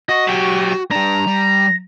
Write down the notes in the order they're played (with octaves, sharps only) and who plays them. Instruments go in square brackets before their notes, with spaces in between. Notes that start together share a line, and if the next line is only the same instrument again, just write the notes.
[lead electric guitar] F#4 [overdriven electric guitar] D#5
[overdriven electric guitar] F#3 G4
[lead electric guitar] G3 D4 [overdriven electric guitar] A#5
[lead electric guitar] G3